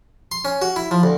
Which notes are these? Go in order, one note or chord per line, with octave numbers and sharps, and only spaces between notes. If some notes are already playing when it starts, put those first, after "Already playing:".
C6
C#4
F#4
E4
F3
D2